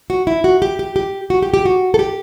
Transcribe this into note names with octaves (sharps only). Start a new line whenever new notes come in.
F#4
E4
F#4
G4
G4
G4
F#4
G4
G4
F#4
A4
G4